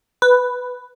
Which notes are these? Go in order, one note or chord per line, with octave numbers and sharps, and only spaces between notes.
B4